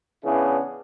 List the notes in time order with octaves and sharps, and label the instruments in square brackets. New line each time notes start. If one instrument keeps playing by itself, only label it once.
[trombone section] C#3 E3 B3 D4 E4 G#4